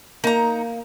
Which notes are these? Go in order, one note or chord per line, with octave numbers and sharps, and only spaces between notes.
A#3 D#4 A#5